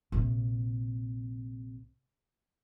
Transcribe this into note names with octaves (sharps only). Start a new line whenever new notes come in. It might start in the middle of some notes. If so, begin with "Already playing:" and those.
A#1 C3